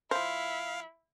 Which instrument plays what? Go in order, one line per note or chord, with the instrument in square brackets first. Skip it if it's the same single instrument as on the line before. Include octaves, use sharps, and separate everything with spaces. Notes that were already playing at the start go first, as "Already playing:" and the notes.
[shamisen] F3 C5 [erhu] E4 [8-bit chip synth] F5